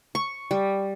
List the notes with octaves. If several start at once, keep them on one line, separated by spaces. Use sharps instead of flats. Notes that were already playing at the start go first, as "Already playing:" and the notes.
C#6
G3